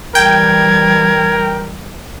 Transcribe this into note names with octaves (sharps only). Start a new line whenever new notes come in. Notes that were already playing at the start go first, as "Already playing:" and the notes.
E3 G3 A#4 G5 G#6